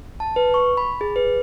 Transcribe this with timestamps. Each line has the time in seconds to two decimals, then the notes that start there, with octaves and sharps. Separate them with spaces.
0.20 A5
0.36 B4
0.54 C#6
0.77 B5
1.01 G#4
1.16 B4